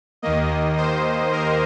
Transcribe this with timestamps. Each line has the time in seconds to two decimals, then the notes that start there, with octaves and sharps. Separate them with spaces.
0.22 D#2 D#3 A#3 D#5
0.77 C5
1.32 A#4